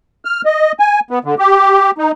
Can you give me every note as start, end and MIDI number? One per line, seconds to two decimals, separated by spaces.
0.25 0.42 89
0.45 0.72 75
0.79 1.00 80
1.10 1.19 59
1.24 1.35 50
1.38 1.91 67
1.98 2.12 63